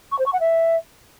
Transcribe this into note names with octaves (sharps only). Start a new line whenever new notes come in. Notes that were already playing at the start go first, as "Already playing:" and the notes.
C#6
C5
C#6
F#5
E5